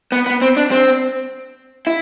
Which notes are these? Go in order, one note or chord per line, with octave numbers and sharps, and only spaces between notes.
B3
B3
C4
D4
C4
E4